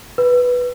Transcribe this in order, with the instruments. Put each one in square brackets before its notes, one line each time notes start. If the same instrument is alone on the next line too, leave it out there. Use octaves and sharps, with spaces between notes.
[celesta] B4